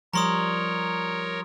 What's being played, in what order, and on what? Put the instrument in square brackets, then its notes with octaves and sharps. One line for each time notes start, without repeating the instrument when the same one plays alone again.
[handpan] F3 G3 [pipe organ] A#4 C#5 [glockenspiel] A#5 C6 D#6